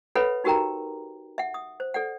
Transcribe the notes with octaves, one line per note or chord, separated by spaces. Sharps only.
A4 B4 C#5 E5 F#5 B5
D#4 F#4 G4 A#4 G5 A#5
E5 F#5
D#6
C5
A4 D5 F#5